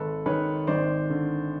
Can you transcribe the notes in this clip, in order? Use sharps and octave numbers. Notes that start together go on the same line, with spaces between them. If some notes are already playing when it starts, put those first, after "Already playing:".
Already playing: G#1 A4 B4
D#3 B4 C#5
G#1 C5 D5
D3